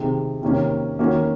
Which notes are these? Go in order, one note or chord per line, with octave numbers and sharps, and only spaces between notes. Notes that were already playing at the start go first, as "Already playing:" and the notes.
Already playing: C3 D#3 G#3
C3 D#3 A#3 C#4
D#3 A#3 C#4 F#4